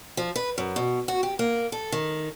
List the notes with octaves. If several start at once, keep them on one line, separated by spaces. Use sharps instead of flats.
F3
B4
F#2
B2
F#4
G4
A#3
A4
D#3